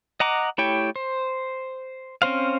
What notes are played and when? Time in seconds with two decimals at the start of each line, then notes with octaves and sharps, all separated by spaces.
0.20 D#5 F#5 A#5 D6
0.58 A3 E4 G4 C#5 G5
0.96 C5
2.22 C4 C#4 C5 F5